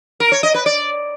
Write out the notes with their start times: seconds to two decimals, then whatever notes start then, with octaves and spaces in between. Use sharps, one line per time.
0.20 A#4
0.32 C#5
0.43 D#5
0.54 B4
0.66 D5